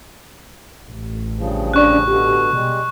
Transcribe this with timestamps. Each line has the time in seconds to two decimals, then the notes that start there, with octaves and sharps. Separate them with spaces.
0.88 A1
1.37 G2 C#3 F3
1.74 C#4 D4 D5 C#6 F#6
2.07 B2 D3 G4
2.53 B2 G3 G#3